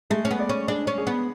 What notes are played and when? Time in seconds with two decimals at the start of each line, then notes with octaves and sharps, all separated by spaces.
0.10 G#3 A3
0.25 C#4
0.31 B3
0.40 D5
0.49 C#4
0.68 D4 G#4
0.87 C#4
0.98 G#4
1.07 B3